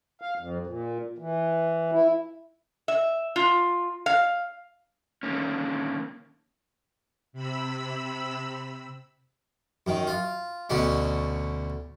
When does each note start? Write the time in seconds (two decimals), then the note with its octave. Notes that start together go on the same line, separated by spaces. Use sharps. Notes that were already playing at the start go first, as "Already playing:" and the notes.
0.22 F5
0.38 F2
0.67 A#2
1.18 E3
1.92 E4
2.88 E5
3.36 F4
4.06 F5
5.23 D3 D#3 A#3 C#4
7.33 C3 B5 E6
9.87 F#2 D#3
10.07 F4
10.70 D2 B2 C#4 D4